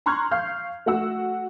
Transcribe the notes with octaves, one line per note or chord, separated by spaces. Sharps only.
A#5 C6 C#6 F6 F#6 G#6
F5 C#6 F6 G6
A3 F#4 F#5 E6